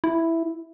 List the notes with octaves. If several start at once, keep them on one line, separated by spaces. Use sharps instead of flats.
E4